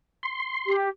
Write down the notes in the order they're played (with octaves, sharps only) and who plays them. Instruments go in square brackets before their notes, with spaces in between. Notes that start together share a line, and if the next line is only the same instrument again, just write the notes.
[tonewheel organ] C6
[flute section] G4